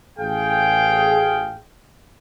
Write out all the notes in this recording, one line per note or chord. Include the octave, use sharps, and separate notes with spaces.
A1 G#4 F5 G5